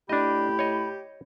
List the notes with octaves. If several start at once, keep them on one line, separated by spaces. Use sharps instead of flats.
A2 D4 G4 D#5 B5
C#5 D#5